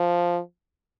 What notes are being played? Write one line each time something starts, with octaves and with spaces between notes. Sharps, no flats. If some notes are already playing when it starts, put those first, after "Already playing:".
Already playing: F3